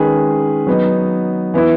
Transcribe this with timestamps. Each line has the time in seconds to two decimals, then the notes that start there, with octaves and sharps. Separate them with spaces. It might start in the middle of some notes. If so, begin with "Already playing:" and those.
Already playing: D#3 G#3 C#4 G#4 B4
0.67 F#3 B3 D#4
1.54 E3 B3 E4